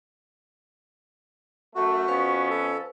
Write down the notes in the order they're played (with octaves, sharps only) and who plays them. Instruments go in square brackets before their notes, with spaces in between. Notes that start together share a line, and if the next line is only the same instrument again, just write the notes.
[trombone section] F#2 A3 [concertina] F#4
[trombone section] F2 B3 C#4 [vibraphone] B4 C5 F5
[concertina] A4